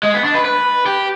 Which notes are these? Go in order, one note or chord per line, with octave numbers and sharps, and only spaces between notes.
G#3
B3
D4
B4
B4
G4